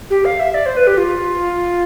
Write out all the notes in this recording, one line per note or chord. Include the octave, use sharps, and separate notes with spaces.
G4
F5
E5
D5
C5
B4
G4
F4